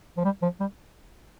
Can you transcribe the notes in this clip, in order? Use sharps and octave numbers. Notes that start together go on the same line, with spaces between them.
F3
G3
F3
G3